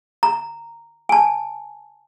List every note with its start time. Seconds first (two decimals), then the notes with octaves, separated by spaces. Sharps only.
0.23 A#5
1.09 G#5 A5